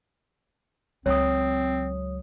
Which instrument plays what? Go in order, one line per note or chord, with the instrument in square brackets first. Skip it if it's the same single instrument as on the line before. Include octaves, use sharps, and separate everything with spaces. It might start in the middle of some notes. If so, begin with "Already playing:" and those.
[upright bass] C#2 F#3 [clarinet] C4 [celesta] C#5 D#6